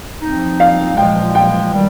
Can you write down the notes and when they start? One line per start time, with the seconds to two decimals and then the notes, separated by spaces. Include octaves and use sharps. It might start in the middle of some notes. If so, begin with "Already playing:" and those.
0.21 F3 C4 D#4
0.60 F5
0.97 A#2 F3 G#3 G5
1.35 G5
1.73 D#3 G3